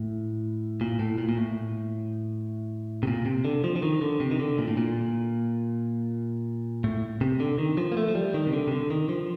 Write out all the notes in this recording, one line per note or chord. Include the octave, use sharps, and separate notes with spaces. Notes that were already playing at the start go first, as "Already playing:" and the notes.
Already playing: A2
A#2
A2
A#2
A#2
A2
C3
A#2
C3
D3
F3
F3
D#3
D3
C3
D#3
D3
A#2
A2
A#2
A2
C3
D3
D#3
F3
A#3
A3
F3
G3
D#3
C3
D3
C3
D3
D#3
F3